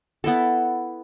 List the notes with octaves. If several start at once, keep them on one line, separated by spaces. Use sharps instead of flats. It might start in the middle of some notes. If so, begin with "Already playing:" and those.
B3 E4 A4